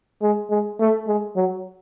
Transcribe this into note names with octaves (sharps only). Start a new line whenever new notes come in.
G#3
G#3
A3
G#3
F#3